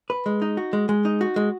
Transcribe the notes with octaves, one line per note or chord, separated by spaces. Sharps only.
B4
G#3
D#4
F#4
G#3
G#3
D#4
F#4
G#3